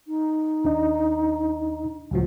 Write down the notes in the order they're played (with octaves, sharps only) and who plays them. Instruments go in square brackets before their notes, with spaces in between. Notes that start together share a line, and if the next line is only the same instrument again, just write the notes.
[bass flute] D#4
[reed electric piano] D#2 D4 D#5
[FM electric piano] C#2 A2 F3 [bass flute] F#3